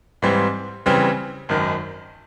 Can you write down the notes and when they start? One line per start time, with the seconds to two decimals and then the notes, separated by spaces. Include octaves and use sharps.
0.22 G#2 E3 G3 C4
0.86 C#3 E3 G3 C4
1.49 G#1 F#2 D#3